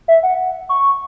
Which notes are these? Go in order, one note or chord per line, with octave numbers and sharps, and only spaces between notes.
E5
F#5
C#6